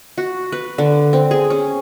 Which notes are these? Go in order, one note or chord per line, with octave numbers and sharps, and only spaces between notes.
F#4
B4
D3
C4
G#4
C#4